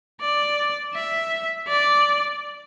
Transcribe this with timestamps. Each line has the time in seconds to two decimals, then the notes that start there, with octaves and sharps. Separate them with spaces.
0.21 D5
0.94 E5
1.68 D5